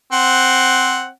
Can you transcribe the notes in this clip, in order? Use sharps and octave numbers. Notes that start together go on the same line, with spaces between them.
C4 F#5